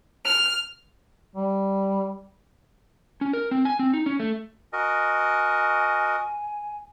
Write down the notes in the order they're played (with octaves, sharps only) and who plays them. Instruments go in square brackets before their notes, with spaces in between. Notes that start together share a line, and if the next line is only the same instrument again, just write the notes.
[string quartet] F6
[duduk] G3
[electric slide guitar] C#4
A#4
C4
G#5
C4
D#4
C#4
A3
[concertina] F#4 A#4 D#5 [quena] G#5